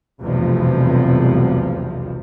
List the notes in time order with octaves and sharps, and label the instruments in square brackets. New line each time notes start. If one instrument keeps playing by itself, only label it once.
[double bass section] F1 B1 E2 G2 C3 F3